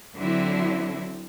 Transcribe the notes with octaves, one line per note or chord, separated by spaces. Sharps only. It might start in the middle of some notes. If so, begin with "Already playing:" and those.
D3 F#3 C4 E4